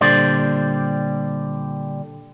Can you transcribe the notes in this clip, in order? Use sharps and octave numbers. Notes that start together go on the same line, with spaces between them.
A#2 D3 G3 C5 D5